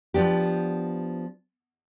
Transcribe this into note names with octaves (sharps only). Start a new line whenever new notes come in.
F3 B3 D4 G4